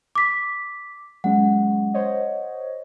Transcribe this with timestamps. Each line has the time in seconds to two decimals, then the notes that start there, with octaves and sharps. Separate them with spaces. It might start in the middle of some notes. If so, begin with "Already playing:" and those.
0.15 D6 B6
1.24 F#3 G#3 C#4 F#5
1.94 C5 C#5 D#5